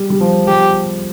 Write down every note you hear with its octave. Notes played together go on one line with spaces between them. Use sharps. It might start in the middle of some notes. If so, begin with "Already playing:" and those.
Already playing: G3
G3
F3
G3 G4